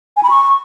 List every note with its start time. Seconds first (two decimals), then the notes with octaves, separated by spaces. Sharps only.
0.17 G#5
0.23 B5
0.30 C#6